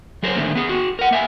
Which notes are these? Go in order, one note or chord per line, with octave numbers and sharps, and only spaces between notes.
F#3 G#4 A#4 C5 C#5
D3 D#3 A3 A#3 C#4
B3 G#4
F#4 G#4
A#4 F#5
A#3 E5 G#5